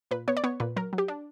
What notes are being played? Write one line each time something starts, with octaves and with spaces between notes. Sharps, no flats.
A#2 B4
B3 C#5
D5
B3 C#5
A#2 B4
F#3 A#4
F#3
G4
D4